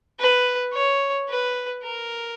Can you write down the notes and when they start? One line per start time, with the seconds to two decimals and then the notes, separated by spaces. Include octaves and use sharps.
0.19 B4
0.74 C#5
1.29 B4
1.84 A#4